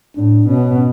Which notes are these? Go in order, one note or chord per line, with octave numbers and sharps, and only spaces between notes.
A2 D4
B2 C#4